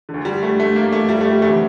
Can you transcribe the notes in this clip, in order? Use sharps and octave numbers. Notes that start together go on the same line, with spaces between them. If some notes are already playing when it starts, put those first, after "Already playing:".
D3
D2
G3
A3
A3
A#3
A3
G3
A3
G3
D2 C3 E3 A3